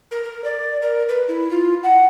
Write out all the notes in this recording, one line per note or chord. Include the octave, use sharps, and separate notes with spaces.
A#4
A#4
D5
A#4
B4
E4
F4
F#5